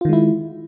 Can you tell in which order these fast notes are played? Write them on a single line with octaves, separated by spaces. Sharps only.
F4 D#3 G#3 E4